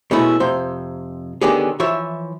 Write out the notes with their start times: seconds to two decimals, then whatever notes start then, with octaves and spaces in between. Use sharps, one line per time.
0.11 B2 G#3 A3 C#4 E4
0.40 F2 C3 C5
1.41 D3 D#3 B3 C#4 G4 G#4
1.80 E3 F3 C#5 E5